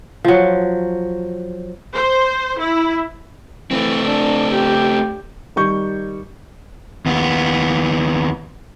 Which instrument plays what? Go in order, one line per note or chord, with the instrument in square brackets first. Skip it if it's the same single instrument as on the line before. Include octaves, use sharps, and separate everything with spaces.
[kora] F3 F#3
[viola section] C5
E4
[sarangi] E3 [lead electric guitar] A3 C4
[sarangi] D4
G4
[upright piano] D#3 G3 C#6 G6
[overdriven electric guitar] D#2 B3